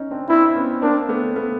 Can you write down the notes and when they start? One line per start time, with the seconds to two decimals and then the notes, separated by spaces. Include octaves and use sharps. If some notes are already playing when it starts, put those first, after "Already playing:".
Already playing: C#4 D#4
0.11 C4 D4
0.29 C4 D4 E4
0.55 B3 C#4
0.82 A#3 C4 D4
1.09 A3 B3
1.36 A3 B3